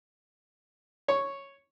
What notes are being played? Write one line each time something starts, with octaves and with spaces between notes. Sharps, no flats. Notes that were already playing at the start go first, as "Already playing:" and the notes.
C#5